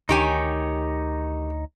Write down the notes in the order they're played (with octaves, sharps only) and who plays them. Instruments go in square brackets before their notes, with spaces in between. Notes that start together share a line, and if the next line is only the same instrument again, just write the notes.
[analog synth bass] D2 [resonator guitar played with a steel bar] D#3 G4 G#5 [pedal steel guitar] D#4 C#5